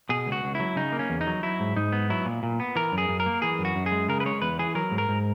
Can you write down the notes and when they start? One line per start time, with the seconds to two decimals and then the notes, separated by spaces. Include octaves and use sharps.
0.09 B2 G#4
0.26 C#2
0.32 F#4
0.44 C#2
0.55 F#3 E4
0.76 C#3 D#4
0.92 A#3
0.99 C#4
1.09 E2
1.21 D#4
1.27 F#3
1.43 F#3 E4
1.60 G#2
1.76 G#2 D#4
1.92 B3
2.10 F#3 E4
2.25 A#2
2.43 A#2
2.60 B3
2.76 E3 A#4
2.92 F#2
2.98 G#4
3.09 F#2
3.20 A#4
3.26 A#3
3.42 E3 G#4
3.59 F#2
3.65 F#4
3.75 F#2
3.86 G#4
3.92 G#3
4.08 C#3 A#4
4.20 B4
4.25 G#3 C#5
4.42 E2 B4
4.59 E3 G#4
4.75 F#3 A#4
4.91 G#2
4.98 A#4
5.09 G#2